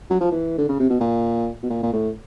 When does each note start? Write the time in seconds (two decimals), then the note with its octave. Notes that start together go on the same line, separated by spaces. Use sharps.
0.10 F#3
0.21 F3
0.32 E3
0.58 D3
0.69 C#3
0.79 C3
0.90 B2
1.00 A#2
1.63 B2
1.70 A#2
1.83 A#2
1.93 A2